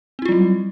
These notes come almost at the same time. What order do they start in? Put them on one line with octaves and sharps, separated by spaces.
C4 E4 F4 F#3 G3